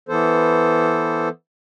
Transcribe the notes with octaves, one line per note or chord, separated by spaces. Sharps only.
E3 B3 A4 C5